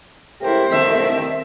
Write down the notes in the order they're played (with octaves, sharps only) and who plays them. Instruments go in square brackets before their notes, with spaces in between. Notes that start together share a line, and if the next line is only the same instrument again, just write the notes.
[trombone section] C#2 A3 G4 [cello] E4 A#4 [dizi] C5
[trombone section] C2 G2 A3 [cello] D#3 C4 [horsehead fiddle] E5